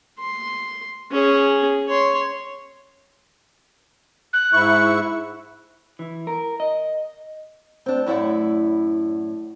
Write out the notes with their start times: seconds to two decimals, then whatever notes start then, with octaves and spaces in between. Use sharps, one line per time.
0.19 C6
1.11 C#4 G#4
1.88 C#5 C6
4.33 F#6
4.53 G#2 E4 C#6
5.99 E3
6.27 A#4
6.60 D#5
7.86 C4 D4
8.06 F#2 A2 E4 D5 F#5